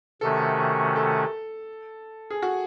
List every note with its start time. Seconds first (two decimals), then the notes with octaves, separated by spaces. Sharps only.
0.21 C3 D#3 A3 C#4 F#4 A4
0.96 A4
2.30 G#4
2.42 F#4